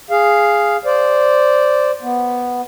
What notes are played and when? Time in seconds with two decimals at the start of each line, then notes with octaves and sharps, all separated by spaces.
0.11 G#4 F5
0.85 C5 D5
2.02 B3